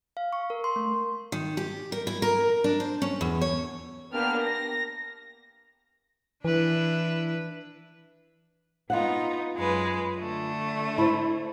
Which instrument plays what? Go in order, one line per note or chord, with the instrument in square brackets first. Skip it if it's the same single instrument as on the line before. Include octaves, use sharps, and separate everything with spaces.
[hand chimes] F5
C#6
A#4
C6
A3
[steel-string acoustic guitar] D#3
G4
A#4
E4
A#4
D4
C5
C#4
E2
C#5
[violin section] A#3 B3 D4 G4 F6
A#6
[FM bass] E3 [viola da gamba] D4 E4 B4
[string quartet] B3 D#4 [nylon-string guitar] F4 F5 F#5
[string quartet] F#2 G#3 B4
D3 A3
[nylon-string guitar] E4 C5